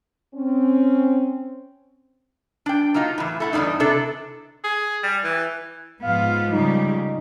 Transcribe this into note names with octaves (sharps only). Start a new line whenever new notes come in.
C4 C#4
D4 G5
F#3 A#3 D#4 F4
A2 E3
A3 E4 F#5
E2 G2 A#2 D4 D#4
C3 D4 E4 A4
G#4
G3
E3
G#2 F3 B3 F4 F5
C#3 G3 D#4